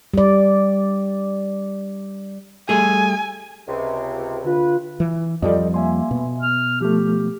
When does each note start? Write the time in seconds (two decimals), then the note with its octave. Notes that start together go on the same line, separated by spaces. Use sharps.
0.14 G3 D5
2.69 G3 A3 G#4 G#5
3.68 C#2 C3
4.44 D3 F4 B4
5.00 E3
5.42 F2 F3 G3 A4 D5 D#5
5.74 A#3 E5 G#5 C6
6.11 B2
6.42 F6
6.81 F3 A3 G4